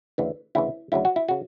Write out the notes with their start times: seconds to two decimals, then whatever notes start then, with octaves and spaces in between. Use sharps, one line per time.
0.18 D2 C#3 E3
0.55 D2 C#3 E3 E4
0.92 D2 C#3 F#3 E4
1.05 F#4
1.16 E4
1.28 C#3 F#4